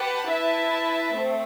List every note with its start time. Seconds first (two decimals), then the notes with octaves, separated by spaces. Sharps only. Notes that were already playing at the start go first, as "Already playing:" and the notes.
Already playing: G4 B4 F#5 A5
0.29 E4 B4 E5 A5
1.15 A3 C4